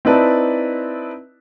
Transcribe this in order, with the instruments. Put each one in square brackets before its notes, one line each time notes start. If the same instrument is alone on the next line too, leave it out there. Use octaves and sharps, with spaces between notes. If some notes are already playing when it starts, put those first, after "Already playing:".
[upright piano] C4 D#4 E4 B4 D5 A5